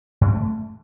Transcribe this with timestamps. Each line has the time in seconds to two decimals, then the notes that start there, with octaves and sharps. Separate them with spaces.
0.21 G2
0.28 C4
0.34 A3